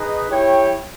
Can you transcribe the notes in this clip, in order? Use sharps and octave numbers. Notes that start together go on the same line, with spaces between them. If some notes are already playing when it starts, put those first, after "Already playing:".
Already playing: D#4 G#4 B4 D#5
E4 G4 C#5 G5